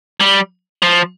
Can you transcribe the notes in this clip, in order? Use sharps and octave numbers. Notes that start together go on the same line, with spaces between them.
G3
F3